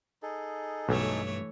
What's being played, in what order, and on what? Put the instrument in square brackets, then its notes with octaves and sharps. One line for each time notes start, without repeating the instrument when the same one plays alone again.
[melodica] D#4 G#4 A4
[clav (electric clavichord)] B1 [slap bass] G2 [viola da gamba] E3 A3 C#5